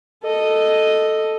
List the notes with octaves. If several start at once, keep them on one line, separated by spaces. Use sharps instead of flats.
A4 D#5